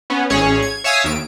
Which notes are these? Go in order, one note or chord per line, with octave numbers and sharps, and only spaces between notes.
B3 C#4
A1 C#4 G#4 C#5
G#6
C#5 E5 F5 G#5 D#6 E6
D#2 D7